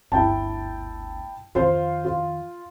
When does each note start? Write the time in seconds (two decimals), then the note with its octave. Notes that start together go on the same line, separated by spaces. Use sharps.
0.12 G1 D2 E4 G5 A5
1.55 F2 D#3 F4 C5 F5
2.05 F4